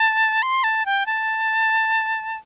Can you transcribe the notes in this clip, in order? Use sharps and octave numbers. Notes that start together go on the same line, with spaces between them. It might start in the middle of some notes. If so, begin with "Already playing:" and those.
Already playing: A5
C6
A5
G5
A5